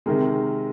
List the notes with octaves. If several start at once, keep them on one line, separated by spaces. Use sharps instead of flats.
C3 D#3 G#3 A#4